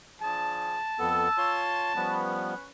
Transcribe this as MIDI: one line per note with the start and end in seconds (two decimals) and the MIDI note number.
0.22 0.77 53
0.22 0.77 62
0.22 0.77 68
0.22 2.24 81
0.99 1.28 41
0.99 1.28 59
0.99 1.28 69
0.99 1.57 88
1.38 1.93 65
1.38 1.93 73
1.38 1.93 84
1.95 2.54 53
1.95 2.54 55
1.95 2.54 59
1.95 2.66 61
1.95 2.66 71